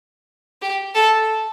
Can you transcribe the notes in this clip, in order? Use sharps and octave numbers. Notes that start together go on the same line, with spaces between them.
G4
A4